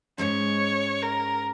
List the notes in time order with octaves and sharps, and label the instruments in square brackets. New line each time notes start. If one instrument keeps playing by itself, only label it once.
[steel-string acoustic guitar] G#2 G#3 C#4 [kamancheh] C#5
[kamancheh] A#4